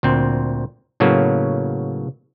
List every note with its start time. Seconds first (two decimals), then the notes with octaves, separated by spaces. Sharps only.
0.03 D2 A#2 C4
1.00 A2 C#3 F#3 A#3 B3